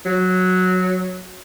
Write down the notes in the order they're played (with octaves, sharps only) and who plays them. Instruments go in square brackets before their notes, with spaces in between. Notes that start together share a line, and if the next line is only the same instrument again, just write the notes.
[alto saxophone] F#3